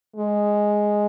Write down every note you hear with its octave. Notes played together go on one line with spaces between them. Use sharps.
G#3